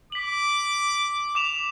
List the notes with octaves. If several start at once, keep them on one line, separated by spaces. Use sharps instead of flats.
D6 B6 F#7
D6 E7 F7